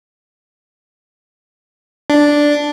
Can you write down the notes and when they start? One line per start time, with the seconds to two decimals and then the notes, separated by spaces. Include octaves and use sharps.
2.10 D4